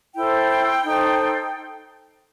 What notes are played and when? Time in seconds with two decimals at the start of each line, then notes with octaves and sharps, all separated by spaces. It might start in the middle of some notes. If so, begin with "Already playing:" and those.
0.16 E4 A4 C5 G5
0.84 D#4 A4 C5